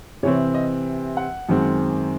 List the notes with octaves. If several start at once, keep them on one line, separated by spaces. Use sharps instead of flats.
C3 E3 C4 C#5
D#5
F#5
F#2 D#3 G#3 C4